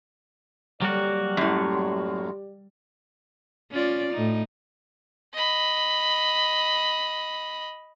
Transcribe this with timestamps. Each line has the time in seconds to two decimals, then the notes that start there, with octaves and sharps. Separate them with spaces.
0.81 F#3 G3 A#3 F#4 G4 D5
1.37 F#2 A2
3.71 C#4 F4 D5
4.13 A2 D#4
5.34 D#5 B5